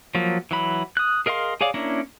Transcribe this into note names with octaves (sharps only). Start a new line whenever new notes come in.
F3 F#3 A#3
E3 F#3 B5
D#6 F#6
G#4 A#4 D#5 F5 C6
G#4 C#5 D5 F5
A#3 C#4 D4 E4 A#4